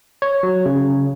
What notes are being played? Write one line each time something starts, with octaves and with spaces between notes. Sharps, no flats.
C#5
F#3
C#3